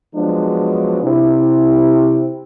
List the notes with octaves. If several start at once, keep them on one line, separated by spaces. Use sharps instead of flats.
F3 F#3 G#3 B3 D4
C3 E4